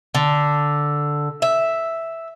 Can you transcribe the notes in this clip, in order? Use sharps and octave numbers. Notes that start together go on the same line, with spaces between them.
D3
E5